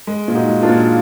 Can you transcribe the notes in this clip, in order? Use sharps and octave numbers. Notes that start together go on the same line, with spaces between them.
G#3
A#2
D#4 F#4
G#3
D4 F4
A#2